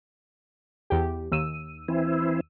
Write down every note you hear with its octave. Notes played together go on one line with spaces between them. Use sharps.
E2 G4
D#2 E6 D#7
E3 C4 E4